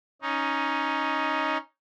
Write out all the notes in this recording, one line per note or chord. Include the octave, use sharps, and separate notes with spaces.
C#4 D#4